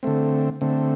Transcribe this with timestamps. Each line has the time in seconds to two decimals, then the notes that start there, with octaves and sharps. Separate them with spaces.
0.03 D3 A3 C4
0.61 D3 A3 C4